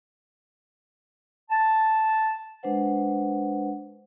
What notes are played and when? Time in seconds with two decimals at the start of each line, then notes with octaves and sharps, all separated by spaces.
1.50 A5
2.63 G#3 D4 B4 C5 F#5